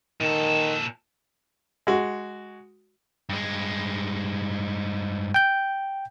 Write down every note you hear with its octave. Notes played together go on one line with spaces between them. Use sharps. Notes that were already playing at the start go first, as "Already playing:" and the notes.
A#2 D#3 A4
G#3 F#4
G2 G#3
G5 G6